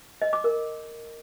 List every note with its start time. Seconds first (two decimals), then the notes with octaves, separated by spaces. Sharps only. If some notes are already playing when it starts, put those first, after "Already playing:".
0.22 D#5
0.33 D6
0.44 A#4